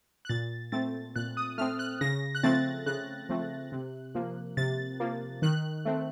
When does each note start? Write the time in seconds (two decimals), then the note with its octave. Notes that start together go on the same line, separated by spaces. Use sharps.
0.25 F#6
0.29 A#2 A6
0.72 A3 C4 A6
1.16 A#2 F#6
1.37 D#6
1.58 A3 C4 F6
1.79 F#6
2.01 C#3 A#6
2.35 F#6
2.43 F3 A3 C4 A6
2.86 C#3 F#6
3.29 F3 A3 C4
3.72 C3
4.15 F3 A#3
4.57 C3 A6
5.00 F3 A#3
5.42 D#3 F#6
5.85 A3 C4